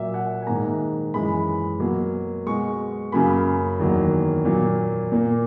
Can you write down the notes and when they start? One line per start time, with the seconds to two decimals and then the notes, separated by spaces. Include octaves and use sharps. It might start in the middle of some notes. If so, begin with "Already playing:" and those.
Already playing: A#2 F#3 A#3 E5
0.14 F#5
0.42 G#5
0.47 G#2 D#3 A#3 A#5
1.14 F#2 E3 G#3 B5
1.80 B2 F#3 A#3
2.46 B2 G#3 C#6
3.12 F#2 C#3 F#3 A#3 B5
3.79 E2 D#3 F#3 A#3
4.45 A#2 F#3 A#3
5.12 A#2 A#3